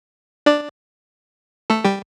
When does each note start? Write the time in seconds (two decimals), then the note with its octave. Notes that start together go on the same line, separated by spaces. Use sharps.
0.46 D4 D5
1.70 A3 A4
1.84 G3 G4